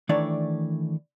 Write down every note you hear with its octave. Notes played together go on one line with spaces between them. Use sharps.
D#3 E3 A3 D4 C#5 D5